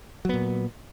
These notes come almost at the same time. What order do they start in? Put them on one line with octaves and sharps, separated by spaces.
F#3 B3 A#2